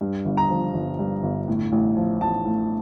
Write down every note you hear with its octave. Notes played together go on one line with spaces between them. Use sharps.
G2
G1
A#5
F3
G1
G2
G1
A2
A1
F3
A1 A5
A2